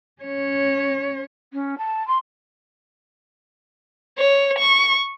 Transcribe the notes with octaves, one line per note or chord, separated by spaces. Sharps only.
C#4 C#5
C#4
A5
C6
C#5
C#6